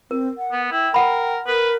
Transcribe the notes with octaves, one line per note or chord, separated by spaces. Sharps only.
C4 A#4
F#5
B3
E4 G5
A#4 F#5 B5
A#4 B4